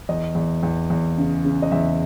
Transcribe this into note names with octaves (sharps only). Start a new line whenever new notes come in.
E2 D#5
E2
E2
E2
C#3
C#3
D#5
E2 E5